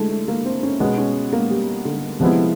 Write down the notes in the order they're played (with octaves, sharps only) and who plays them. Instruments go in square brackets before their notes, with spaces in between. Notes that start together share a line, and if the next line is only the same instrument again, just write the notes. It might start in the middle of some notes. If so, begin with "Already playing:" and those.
Already playing: [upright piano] D3 G#3 A3 [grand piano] E4
[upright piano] A3
A#3
C4
C#4
[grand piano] B2 G#3 B3 [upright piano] C#4
[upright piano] C#4
A#3
G3
D3
[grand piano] C3 F3 G#3 B3 E4